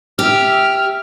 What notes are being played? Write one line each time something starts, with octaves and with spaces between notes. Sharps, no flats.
G4 E5 F6